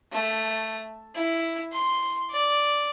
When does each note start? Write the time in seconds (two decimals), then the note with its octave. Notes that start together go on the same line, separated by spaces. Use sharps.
0.12 A3
1.16 E4
1.73 C6
2.31 D5